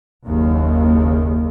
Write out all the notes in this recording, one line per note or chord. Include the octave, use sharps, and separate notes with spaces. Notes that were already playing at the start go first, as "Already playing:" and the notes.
F#1 D#2